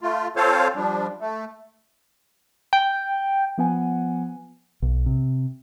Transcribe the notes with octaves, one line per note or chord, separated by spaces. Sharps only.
A3 F4
C4 F4 A4 C5 C#5 F5
F3 G3 D4
A3
G5
F3 B3 F#5 G#5
B1
C3